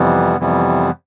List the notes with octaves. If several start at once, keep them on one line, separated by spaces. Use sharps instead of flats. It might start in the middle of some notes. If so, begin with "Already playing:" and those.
Already playing: F2 C3 E3 G3 B3
F2 C3 E3 G3 B3